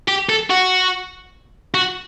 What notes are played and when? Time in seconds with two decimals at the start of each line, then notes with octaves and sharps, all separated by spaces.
0.08 G4
0.29 A4
0.50 F#4
1.74 F#4